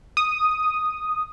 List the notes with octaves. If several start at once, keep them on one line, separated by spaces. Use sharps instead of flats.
D#6